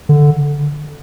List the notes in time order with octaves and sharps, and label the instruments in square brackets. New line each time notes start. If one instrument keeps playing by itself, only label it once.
[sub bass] D3